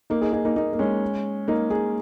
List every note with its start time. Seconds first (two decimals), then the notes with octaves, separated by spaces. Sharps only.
0.10 A#3 D#4
0.21 D#4 G#4
0.33 D#4 G#4
0.45 A#3 D#4
0.56 A#3 D#4
0.73 A#3
0.79 G#3 C#4
1.48 A#3 D#4
1.70 D#4 G#4